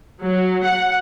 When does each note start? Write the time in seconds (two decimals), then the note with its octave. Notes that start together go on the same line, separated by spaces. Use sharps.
0.20 F#3
0.64 F#5